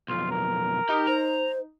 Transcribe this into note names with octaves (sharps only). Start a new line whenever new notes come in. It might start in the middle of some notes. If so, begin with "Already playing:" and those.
B1 F2 F4
A#4
D#4 G4
C5 A#5